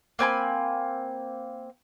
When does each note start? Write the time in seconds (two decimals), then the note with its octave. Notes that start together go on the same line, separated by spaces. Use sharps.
0.19 A#3 C4 G#5 B5